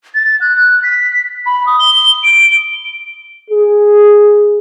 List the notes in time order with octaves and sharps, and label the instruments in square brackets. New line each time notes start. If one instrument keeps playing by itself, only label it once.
[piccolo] A6
F#6
B6
B5
D#6
G7
D7
[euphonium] G#4